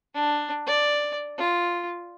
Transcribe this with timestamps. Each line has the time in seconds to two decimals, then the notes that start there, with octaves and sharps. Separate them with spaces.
0.14 D4
0.67 D5
1.38 F4